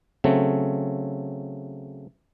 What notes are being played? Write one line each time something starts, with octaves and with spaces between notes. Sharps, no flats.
C#3 F#3 A3 C4